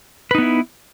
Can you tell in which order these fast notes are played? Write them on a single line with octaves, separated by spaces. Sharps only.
B4 D#4 B3 E4